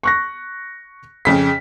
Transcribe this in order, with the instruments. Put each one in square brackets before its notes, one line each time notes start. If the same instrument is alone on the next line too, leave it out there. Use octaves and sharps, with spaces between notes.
[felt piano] C#6 F#6 A#6
[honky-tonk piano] F2 C#3 B6